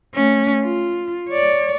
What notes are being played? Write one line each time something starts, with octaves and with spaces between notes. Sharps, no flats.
A3 C#4
F4
C#5 D5